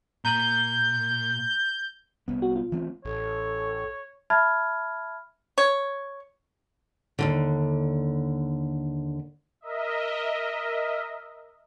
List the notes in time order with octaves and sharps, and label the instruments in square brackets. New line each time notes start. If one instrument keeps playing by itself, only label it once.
[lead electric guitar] A#2 [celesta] A#5 D#7 F#7 [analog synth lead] G6
[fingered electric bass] C2 B3
[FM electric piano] F#4
F4
[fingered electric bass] E3 A3 C4
[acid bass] A1 [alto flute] A4 [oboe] C#5
[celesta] E5 A5 B5 F6 G#6
[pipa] C#5
[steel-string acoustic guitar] D#2 G#2 D3
[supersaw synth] A#4 D#5 E5